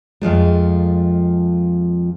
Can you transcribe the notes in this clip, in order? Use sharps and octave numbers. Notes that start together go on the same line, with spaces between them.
F2 F3 G#3 A3